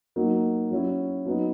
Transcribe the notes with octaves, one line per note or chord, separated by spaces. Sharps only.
F#3 A#3 D#4
F#3 C#4 E4
F#3 B3 D#4